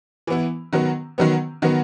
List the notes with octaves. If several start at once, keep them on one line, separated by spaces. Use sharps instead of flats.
E3 B3 E4
D#3 F#3 B3
D#3 F#3 B3
D#3 F#3 B3